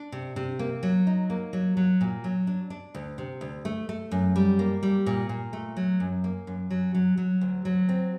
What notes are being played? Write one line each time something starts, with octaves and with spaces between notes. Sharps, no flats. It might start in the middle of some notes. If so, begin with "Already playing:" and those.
Already playing: D4
C3
C3
A#3
F#3
D#4
A#3
F#3
F#3
A#2
F#3
D4
D4
D2
C3
D2
A3
A3
F#2
G3
A#3
G3
A#2
A#2
A3
F#3
F#2
A#3
F#2
F#3
F#3
F#3
D2
F#3
C4